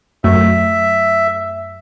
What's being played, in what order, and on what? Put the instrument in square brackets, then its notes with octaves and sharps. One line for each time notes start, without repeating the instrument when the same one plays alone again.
[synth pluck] F#2 F#3 A3 [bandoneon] E5